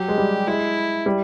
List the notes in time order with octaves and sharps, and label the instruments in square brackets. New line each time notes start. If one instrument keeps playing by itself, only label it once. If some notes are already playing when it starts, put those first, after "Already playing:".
Already playing: [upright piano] F#3 [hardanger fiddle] G4
[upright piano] G#3
G3
[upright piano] G#3 [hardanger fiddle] E4
[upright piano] G3